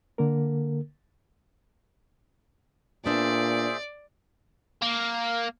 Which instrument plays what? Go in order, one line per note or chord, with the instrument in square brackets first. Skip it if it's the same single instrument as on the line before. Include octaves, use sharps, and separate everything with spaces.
[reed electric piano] D3 A#3 A#4
[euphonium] A#2 [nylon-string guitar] B3 D4 [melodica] G#4 C5 E5 [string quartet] D5
[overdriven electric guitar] A#3